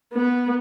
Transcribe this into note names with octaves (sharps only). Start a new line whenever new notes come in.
B3